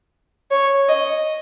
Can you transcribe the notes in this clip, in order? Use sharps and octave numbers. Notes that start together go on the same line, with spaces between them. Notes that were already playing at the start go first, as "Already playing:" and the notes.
C#5
D#5